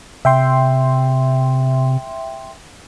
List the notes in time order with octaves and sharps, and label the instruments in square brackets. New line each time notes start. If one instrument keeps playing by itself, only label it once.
[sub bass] C3 [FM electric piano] E5 G5 C6